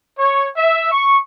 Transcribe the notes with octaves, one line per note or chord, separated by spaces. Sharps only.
C#5
E5
C#6